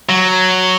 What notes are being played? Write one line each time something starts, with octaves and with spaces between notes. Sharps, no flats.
F#3